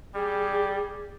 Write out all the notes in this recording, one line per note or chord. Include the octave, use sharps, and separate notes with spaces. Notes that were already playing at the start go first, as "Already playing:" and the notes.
G3 G#4